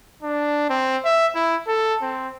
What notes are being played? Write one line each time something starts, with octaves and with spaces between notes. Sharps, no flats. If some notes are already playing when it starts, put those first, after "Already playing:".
D4
C4
E5
E4
A4
C4